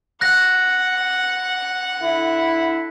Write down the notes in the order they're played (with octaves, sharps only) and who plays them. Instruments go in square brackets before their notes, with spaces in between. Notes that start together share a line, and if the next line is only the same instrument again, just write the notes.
[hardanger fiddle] F#5 [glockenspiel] F#6 A#6
[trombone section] D3 E4